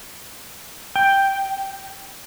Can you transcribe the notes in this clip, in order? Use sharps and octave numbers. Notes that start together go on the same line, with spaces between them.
G5